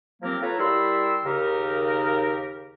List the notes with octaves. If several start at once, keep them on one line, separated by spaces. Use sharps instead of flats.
F3 F#3 A#3 C4 G4 A#4
F4 A4 B4 C#5 A#5
G3 E4 A#4 C6 E6
D#2 C#3 D#4 G4 A#4